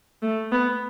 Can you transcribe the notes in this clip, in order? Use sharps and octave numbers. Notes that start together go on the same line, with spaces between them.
A3
B3